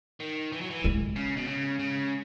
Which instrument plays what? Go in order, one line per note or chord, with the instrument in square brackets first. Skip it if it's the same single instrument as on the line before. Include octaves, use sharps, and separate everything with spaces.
[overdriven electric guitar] D#3
E3
F#3
E3
[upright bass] G#3
[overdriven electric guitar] C#3
B2
C#3
C#3